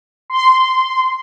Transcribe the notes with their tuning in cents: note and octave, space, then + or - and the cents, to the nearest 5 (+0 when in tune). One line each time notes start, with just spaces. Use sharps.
C6 -15